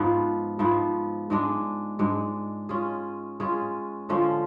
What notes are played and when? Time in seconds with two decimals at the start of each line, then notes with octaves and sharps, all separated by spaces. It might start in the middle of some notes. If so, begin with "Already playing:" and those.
Already playing: G#2 F3 B3
0.59 G#2 F3 B3
1.30 G#2 G#3 D4
1.99 G#2 G#3 D4
2.69 G#3 C#4 F4 G#4
3.40 G#3 C#4 F4 G#4
4.09 D3 F3 G#3 C#4